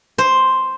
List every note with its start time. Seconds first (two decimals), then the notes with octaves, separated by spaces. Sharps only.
0.18 C5